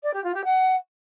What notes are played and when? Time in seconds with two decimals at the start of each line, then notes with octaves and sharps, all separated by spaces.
0.03 D5
0.13 G4
0.24 F4
0.34 G4
0.44 F#5